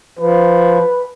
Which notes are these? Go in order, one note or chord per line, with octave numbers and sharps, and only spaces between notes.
F3 B4